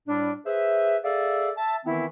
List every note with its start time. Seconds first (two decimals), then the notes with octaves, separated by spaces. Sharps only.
0.07 A2 G3 D4
0.46 G#4 B4 C5 E5
1.04 G#4 A4 D5 E5 F5
1.57 E5 A5
1.85 D#3 E3 B3 C4 E4